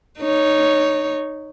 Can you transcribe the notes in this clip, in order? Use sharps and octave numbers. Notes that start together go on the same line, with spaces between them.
D#4 C#5